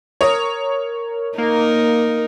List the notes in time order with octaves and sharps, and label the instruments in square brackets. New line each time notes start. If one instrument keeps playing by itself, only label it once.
[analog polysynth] A#4 [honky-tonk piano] C#5 D#6
[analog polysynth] A#3 [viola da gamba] D#4 A#4